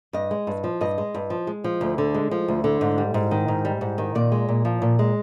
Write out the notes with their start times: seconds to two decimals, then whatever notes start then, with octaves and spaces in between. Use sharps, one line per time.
0.13 G2 D#5
0.31 G#3
0.47 G2
0.64 F3
0.81 G2 D#5
0.98 G#3
1.14 G2
1.30 F3
1.47 G#3
1.64 F3
1.81 D2
1.98 D3
2.15 G#3
2.31 F3
2.48 D2
2.64 D3
2.81 G#2
2.98 G3
3.14 G#2
3.31 D#3
3.48 G#2
3.65 G3
3.81 G#2
3.98 D#3
4.15 A#2 D5
4.32 G#3
4.49 A#2
4.65 F3
4.82 A#2
4.99 G#3